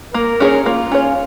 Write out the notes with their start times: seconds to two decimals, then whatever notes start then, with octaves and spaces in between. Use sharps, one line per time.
0.14 A#3 A#4
0.40 C#4 G#4 C#5
0.66 A#3 F4
0.92 C#4 G#4 C#5